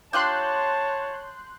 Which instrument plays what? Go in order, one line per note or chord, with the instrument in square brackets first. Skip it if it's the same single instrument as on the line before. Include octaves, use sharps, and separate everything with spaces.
[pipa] D4 F4 G4 [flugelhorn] C#5 [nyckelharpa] A5 [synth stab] C6 F#6 G6